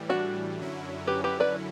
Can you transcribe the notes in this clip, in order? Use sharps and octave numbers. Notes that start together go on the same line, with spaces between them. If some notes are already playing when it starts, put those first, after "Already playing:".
Already playing: A2 E3 G3
D4 F#4
F#2 D3 F#3 C#4 E4
G4 B4
G4 B4
B4 D5